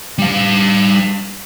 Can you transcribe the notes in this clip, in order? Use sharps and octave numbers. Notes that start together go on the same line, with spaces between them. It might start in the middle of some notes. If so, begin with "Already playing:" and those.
G3 F5